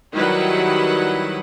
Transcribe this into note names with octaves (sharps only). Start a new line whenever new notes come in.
D#3 F#3 G3 E4 B4 F#5